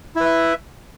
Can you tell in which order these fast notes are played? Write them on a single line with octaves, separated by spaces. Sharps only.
E4 B4 E5